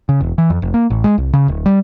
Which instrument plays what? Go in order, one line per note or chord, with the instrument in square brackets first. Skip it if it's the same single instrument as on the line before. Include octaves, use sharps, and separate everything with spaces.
[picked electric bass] C#3
E1
E3
F2
F1
A#3
A1
G#3
C2
C#3
D1
G3